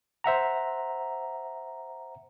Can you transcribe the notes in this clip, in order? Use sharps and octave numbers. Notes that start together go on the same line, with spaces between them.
C5 E5 F#5 A#5